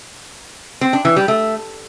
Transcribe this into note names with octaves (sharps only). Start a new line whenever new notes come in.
C4
D4
E3
G3
A3